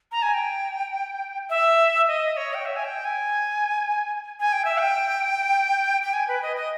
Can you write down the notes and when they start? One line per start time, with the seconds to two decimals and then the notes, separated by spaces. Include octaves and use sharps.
0.12 A#5
0.22 G#5
0.34 G5
1.50 E5
2.08 D#5
2.37 C#5
2.54 G5
2.65 E5
2.76 G#5
2.85 G5
3.05 G#5
4.40 G#5
4.53 G5
4.65 E5
4.78 G5
6.03 G5
6.13 G#5
6.28 B4
6.43 D#5
6.57 D#5